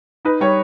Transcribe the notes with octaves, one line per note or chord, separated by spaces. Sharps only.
D#4 B4
G3 C#5